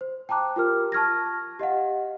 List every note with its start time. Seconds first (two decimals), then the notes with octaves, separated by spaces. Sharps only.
0.01 C5
0.29 G5 A5 A#5 D6 F#6
0.56 F4 G4 A#4 F6
0.92 A5 C#6 F6 G#6 A#6
1.59 G4 D#5 F5 F#5